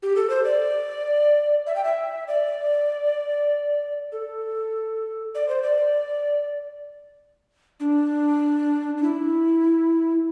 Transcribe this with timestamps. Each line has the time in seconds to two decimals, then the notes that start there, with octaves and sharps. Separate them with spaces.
0.03 G4
0.16 A4
0.30 C5
0.45 D5
1.67 E5
1.76 G5
1.84 E5
2.28 D5
4.12 A4
5.35 D5
5.49 C5
5.63 D5
7.80 D4
8.97 D4
9.03 E4